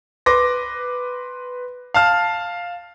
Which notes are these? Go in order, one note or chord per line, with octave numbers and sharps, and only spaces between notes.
B4 C6 D6 A#6
F5 A5 F6